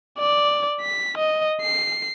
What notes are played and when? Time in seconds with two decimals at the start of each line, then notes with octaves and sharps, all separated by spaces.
0.19 D5
0.81 B6
1.18 D#5
1.61 C7